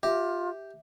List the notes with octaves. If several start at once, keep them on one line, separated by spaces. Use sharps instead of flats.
F4 G4 E5